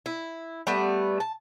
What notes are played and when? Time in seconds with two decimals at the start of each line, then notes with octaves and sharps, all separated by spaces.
0.06 E4
0.67 G3 A3 B3
1.20 A5